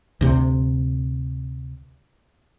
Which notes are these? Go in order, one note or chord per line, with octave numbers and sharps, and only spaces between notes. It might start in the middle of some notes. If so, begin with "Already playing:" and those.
D2 C3